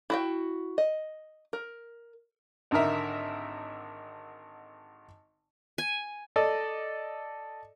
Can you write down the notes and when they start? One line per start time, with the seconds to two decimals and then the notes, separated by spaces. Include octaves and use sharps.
0.10 E4 F#4 G5
0.78 D#5
1.53 A#4
2.71 G#1 D3 D#4 A#4 E5
5.78 G#5
6.36 A4 D5 D#5